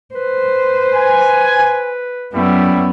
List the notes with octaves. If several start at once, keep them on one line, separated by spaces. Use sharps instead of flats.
B4 C5
G#5
F#2 G3 A3 B3 E4